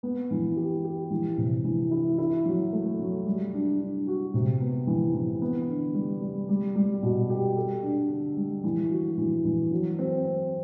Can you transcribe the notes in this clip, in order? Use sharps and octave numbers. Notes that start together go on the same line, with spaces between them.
B3
E3
G4
G4
E3
C3
E3
E4
E4
F#3
A3
F#3
G3
D4
D4
F#4
C3
B3
E3
E3
B3
D3
G3
G3
G3
G3
B2
G4
A4
D4
D3
G3
E3
F#4
E3
E3
F#3
C4
C4